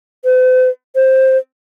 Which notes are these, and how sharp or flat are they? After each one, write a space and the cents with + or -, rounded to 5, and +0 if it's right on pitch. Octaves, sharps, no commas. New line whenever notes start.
C5 -45
C5 +10